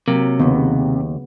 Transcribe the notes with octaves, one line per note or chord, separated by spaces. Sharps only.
C3 F#3 A#3
D#2 C#3 B3